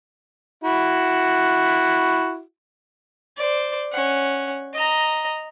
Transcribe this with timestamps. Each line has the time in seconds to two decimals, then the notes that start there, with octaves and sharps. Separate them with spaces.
0.64 E4 F#4
3.38 C5 D5
3.93 C#4 F#5
4.74 D#5 A#5